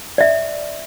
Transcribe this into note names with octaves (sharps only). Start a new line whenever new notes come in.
D5 E5